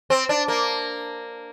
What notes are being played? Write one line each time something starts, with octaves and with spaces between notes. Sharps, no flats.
C4
D4
A#3